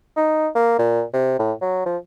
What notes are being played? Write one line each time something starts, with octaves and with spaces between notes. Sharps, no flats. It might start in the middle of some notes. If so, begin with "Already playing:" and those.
D#4
A#3
A#2
C3
A2
F#3
F3